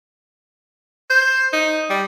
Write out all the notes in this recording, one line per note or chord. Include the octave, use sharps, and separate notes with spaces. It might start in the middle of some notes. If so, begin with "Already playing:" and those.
C5
D#4
G3